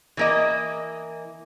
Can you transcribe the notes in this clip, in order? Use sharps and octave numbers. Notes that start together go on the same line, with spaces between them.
E3 A#3 D#5